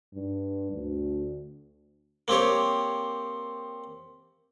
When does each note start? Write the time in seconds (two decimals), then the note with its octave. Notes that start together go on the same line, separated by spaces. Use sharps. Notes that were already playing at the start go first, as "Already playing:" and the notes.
0.14 G2
0.73 D2
2.28 A#3 C4 G4 C#5